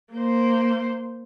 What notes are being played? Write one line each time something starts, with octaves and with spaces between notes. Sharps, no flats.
A#3 C5